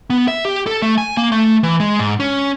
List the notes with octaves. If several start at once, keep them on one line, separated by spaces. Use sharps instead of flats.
B3
E5
G4
A4
A3
G#5
A#3
A3
E3
G#3
G#2
C#4